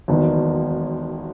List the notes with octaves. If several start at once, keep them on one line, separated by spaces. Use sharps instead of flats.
E1 D#2 D#3 F#3 B3